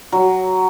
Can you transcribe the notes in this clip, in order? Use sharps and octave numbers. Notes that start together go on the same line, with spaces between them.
F#3